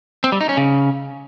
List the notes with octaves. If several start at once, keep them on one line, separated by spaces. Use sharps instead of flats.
C4
G3
D#4
C#4
C#3